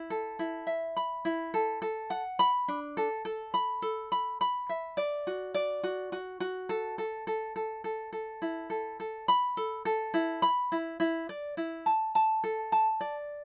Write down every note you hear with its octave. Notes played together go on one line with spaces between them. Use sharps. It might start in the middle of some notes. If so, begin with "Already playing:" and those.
Already playing: E4
A4
E4
E5
B5
E4
A4
A4
F#5
B5
D4
A4
A4
B5
A4
B5
B5
E5
D5
F#4
D5
F#4
F#4
F#4
A4
A4
A4
A4
A4
A4
E4
A4
A4
B5
A4
A4
E4
B5
E4
E4
D5
E4
A5
A5
A4
A5
D5